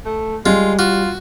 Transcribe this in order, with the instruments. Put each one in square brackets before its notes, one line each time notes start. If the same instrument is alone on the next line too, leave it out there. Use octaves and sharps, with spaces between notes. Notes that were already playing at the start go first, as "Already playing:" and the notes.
[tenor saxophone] A3
[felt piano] G3 [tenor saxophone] G#3 [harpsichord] F4
[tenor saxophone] F4 [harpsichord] F#4